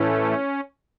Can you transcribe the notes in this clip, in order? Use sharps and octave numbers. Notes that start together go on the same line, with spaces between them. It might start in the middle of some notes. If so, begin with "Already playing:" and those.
Already playing: A2 E3 A3 C#4